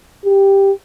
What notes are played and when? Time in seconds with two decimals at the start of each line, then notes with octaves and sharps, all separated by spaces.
0.25 G4